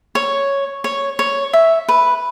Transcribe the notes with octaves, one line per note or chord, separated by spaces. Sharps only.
C#5
C#5
C#5
E5
B4